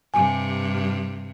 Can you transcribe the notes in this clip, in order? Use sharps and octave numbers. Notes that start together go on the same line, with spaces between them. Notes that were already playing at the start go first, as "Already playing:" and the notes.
G2 C3 G#5